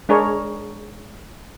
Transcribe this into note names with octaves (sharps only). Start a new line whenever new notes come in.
G#3 D4 G#4 A#4 C#5